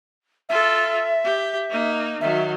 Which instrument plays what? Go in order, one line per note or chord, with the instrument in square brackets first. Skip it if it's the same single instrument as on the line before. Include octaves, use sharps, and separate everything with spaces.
[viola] F4 A4 [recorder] E5
[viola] G4
A#3 D#4
[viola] D#3 F#3 [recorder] E5